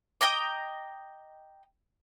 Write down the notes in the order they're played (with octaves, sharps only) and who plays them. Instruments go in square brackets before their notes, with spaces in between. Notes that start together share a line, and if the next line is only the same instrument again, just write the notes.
[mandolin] D#5 G5 A#5 D6